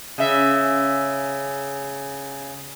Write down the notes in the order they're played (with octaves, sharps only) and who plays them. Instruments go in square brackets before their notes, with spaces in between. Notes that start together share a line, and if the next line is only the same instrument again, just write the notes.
[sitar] C#3 E5